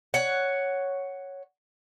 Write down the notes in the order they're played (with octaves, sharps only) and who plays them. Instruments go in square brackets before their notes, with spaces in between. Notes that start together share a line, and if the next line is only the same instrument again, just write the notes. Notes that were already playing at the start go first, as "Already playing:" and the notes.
[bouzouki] C#5 F#5